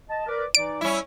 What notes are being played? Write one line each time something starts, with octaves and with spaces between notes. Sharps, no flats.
D#5 A5
A#4 B4 D5
E3 D#4 D5 D7
G3 C#4 E4